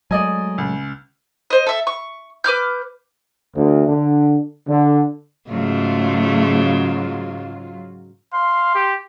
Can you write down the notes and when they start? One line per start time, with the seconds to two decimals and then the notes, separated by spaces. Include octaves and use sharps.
0.11 F#3 G#3 A3 D5 D#5 G#5
0.58 C#2
1.50 C5 D#5
1.67 A4 E5
1.87 C#6
2.44 B4 D6 F6 G6
3.56 D2
3.87 D3
4.69 D3
5.50 G#2 C#3 F#3 A3 F4
8.33 F5 C6
8.75 G4